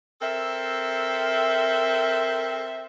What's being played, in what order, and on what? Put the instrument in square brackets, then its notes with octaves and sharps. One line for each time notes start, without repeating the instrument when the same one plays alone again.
[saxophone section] C4 A4 A#4 E5